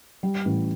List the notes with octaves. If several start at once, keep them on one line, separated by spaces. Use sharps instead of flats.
G3
A1